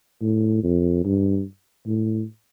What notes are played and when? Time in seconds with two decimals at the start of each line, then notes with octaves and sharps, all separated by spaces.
0.22 A2
0.63 F2
1.05 G2
1.87 A2